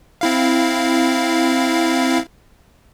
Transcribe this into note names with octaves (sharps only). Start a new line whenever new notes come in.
C4 E4 F5